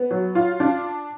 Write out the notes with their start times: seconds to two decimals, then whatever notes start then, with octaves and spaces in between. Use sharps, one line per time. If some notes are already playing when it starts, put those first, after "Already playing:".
Already playing: B3
0.11 F#3
0.35 F4
0.60 D4